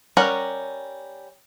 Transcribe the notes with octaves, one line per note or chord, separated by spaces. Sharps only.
G3 C#4 A#4 F#5 A#5